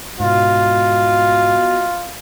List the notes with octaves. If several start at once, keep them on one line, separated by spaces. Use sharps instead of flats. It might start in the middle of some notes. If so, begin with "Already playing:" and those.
G#2 B2 B3 F4 F#4 D#5